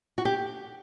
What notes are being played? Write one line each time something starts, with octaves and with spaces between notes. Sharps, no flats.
F#4
G4